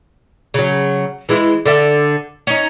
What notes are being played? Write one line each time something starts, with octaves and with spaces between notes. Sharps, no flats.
C#3 F#3
E3 G#3 E4
D3 A4 E5
C#4 D#4